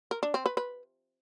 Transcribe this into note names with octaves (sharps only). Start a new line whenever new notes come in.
A#4
D4
C4
B4
B4